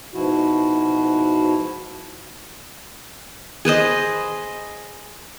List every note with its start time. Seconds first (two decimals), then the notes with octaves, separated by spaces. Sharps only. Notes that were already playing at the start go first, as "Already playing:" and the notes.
0.13 G#2 B2 F3 E4 F#4
3.65 G#4 B4 C5 D#5